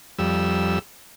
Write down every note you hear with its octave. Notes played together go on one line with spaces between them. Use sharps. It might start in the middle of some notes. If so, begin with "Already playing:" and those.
F2 G3 E6